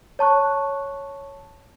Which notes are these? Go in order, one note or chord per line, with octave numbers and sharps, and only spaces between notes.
C#5 A5 C#6 F#6